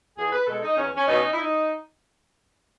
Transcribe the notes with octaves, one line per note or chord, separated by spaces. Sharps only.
E2 G#4
B4
B2 G#3 A4
D#4
E2 C#4
C#4
B2 F#3 C#4 D#4
E4
D#4